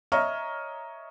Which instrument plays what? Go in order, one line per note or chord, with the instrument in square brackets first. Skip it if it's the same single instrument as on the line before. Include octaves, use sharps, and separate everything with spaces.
[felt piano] C#5 D#5 E5 A#5 C#6 F6